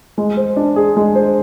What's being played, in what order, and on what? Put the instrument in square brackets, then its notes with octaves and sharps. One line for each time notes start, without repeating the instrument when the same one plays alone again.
[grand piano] G#3
C5
D4
G#4
G#3
C5